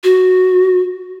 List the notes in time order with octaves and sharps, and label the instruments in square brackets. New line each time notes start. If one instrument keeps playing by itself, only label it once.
[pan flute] F#4